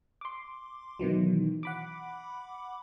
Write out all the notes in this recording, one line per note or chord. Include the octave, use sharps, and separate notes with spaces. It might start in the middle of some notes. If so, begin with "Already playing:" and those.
C6 D6
B2 D#3 E3 F#3
F#5 B5 D6